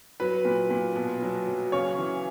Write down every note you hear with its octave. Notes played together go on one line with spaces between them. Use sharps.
F#3 B4
A#2
A#2
B2
F#3
F#3
C#3 C#5
E3